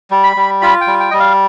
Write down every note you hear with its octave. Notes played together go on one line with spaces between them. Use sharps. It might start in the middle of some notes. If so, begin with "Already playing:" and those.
G3
B5
G3
F4 B5
G5
G3
G5
G3 D#5
F5